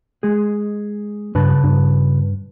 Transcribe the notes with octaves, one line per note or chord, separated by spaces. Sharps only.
G#3 G#4
G2 C#3 B4 A5
G2